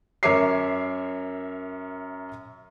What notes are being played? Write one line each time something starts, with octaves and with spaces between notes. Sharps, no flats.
F#2 A#4 C#5 E5 D6 C7